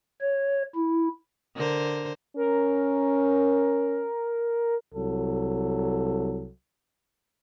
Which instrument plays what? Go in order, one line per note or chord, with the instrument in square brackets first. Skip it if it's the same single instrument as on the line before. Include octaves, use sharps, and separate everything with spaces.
[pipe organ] C#5
E4
[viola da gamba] D3 A#4 C5
[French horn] C#4 [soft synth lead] A#4
[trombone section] C2 F#3 A4